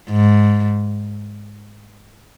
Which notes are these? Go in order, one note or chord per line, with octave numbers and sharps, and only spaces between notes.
G#2